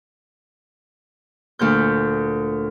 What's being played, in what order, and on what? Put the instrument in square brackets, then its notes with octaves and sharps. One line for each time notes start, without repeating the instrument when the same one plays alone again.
[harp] D2 A#2 G6